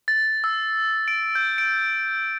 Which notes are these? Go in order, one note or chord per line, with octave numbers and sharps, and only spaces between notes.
A6
E6
D7
G6
D7